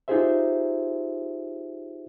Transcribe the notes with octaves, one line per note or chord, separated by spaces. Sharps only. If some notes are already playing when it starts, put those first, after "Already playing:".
D#4 F4 G4 G#4 C5 E5